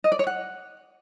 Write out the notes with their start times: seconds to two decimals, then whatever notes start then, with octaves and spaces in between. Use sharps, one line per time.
0.04 D#5
0.12 D5
0.19 C#5
0.27 F#5